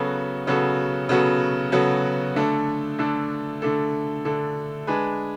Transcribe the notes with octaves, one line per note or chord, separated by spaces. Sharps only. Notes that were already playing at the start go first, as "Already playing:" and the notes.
Already playing: C#3 F#3 B3 F#4 A4
C#3 F#3 B3 F#4 A4
C#3 F#3 B3 F#4 A4
C#3 F#3 B3 F#4 A4
D3 A3 D4 A4
D3 A3 D4 A4
D3 A3 D4 A4
D3 A3 D4 A4
G#3 D4 G#4 B4